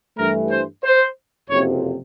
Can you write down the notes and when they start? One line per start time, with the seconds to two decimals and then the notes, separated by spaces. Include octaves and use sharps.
0.18 G2 E3 A3 A#4
0.50 C5
0.84 C5
1.50 F#1 F2 C3 C#5